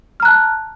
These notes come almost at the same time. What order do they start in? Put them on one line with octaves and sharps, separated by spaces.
F6 A#5 F#6 A5